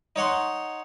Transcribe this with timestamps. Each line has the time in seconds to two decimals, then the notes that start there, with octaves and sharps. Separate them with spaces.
0.16 D#4 C#5 F#5 C6